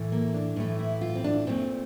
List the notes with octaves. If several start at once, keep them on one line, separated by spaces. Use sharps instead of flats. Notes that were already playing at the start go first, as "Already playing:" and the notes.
Already playing: A2 E3 A3
A#3
D4
A2 E3 A3
E4
F4
C4
D4
A#2 A3 C4